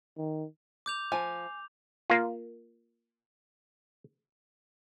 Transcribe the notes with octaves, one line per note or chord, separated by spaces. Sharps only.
D#3
D6 G6 F7
F3 G#5
A#3 F4